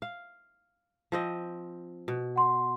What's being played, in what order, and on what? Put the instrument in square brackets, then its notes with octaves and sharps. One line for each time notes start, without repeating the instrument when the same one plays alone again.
[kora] F5
F3 C4 D#5
B2
[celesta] F#5 C6